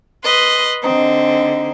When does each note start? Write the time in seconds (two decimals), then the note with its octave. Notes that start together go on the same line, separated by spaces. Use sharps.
0.24 B4 D#5 C6
0.84 D3 C4 D#4